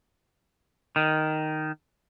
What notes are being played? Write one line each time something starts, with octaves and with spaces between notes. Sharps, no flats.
D#3